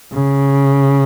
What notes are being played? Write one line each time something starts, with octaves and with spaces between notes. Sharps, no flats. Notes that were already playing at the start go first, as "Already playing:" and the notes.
C#3